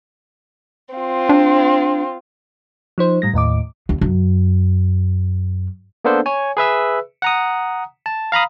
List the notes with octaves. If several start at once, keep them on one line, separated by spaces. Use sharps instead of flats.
C4 F4
D4
F3 D#4 C5
A2 G3 A#6
D#2 A2 D#5 D6
D#2
F#2
A#3 B3 D4 A4 C5
C#5 G#5
G#4 B4 E5 E6
F#5 A#5 D#6
A5
F5 A#5 B5 D#6